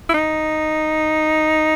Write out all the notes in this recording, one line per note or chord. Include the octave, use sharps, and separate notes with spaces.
E4
D#4